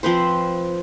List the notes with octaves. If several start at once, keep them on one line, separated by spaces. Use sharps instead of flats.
F3 C4 B4 C5